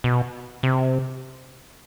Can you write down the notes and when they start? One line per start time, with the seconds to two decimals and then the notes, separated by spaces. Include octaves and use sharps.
0.04 B2
0.63 C3